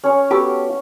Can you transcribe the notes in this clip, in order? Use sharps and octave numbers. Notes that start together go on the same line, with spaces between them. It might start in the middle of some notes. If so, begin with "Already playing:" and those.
C#4 G#4 C#5
B3 F#4 G4 A4